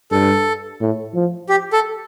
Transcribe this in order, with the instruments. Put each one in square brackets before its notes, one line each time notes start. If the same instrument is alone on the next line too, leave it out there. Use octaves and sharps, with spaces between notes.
[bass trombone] G2 [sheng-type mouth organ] A4
[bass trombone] A2
F3
[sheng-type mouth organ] G4
A4